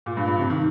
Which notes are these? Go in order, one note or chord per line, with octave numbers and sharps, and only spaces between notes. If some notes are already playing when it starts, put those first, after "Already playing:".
A#2
G2
G2
C3
D#3